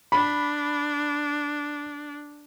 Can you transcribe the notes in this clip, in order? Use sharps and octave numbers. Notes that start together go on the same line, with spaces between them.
D4 B5